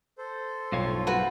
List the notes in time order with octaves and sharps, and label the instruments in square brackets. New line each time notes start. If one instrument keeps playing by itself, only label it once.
[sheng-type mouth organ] A4 C5
[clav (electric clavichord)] B1 [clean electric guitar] G2 F4 C#5
[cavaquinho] F#4 B4